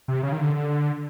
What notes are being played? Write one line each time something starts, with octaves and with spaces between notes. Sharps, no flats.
C3
C#3
D#3
D3